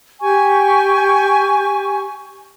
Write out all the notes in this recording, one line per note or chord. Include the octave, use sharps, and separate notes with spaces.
G4 G#5 C#6